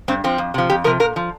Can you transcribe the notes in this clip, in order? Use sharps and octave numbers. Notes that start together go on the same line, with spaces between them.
G2 C4
F3 C4
F2
C3 F3
F2 G4
C3 F3 A#4
A#2 A#4
F3